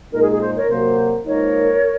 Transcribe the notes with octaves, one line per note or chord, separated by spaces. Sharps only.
A#2 G#3 D#4 A#4
G#4
G#4
C5
A#4 C#5
C3 F#3 A#3 C5
G#2 F3 A#3 D#4 A#4 C#5